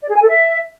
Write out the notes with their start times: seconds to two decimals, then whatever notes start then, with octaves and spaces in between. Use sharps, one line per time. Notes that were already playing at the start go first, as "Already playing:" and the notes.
0.01 D5
0.08 G#4
0.15 G#5
0.22 A4
0.29 E5